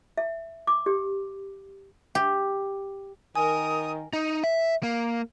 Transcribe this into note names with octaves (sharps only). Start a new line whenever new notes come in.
E5
D6
G4
G4
D#3 A#4 G#5 D#6
D#4
E5
A#3